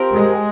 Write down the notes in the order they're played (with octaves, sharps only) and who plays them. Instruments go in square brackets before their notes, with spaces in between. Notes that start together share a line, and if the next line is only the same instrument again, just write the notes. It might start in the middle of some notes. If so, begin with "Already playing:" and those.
Already playing: [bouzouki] F3 C4 G4 A#4
[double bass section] G#3